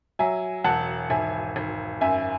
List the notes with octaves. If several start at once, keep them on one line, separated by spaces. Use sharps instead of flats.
F#3 E5 G#5
E1 F#5 A5
G#1 E5 G#5
G#1
F#2 E5 G#5